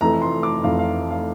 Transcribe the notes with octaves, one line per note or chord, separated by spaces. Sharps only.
F1 F2 E3 A3 A#5
C6
D6
F1 F2 E3 A3 F5
F5
F5